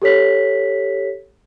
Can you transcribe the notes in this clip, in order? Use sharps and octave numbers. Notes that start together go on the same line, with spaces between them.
G4 A4 C#5 B6